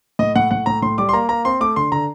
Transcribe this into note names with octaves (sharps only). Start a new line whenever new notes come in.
A2 D#5
A2 F#5
A2 F#5
A2 A#5
A2 C6
G3 D6
C6
A#3 A#5
A#3 A#5
C4 C6
A3 D6
D3 C6
D3 A#5